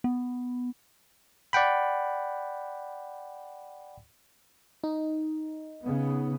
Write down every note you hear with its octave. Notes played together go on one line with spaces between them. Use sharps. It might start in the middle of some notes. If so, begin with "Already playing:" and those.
B3
D5 F#5 G5 B5
D#4
C#3 B3